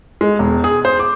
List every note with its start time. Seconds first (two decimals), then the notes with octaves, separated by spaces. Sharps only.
0.21 G#3
0.39 E1
0.64 G#4
0.85 C5
0.99 D6